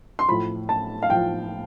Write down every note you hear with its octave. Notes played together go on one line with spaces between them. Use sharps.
C6
A2 F3 B5
A5
F5
A2 F3 G5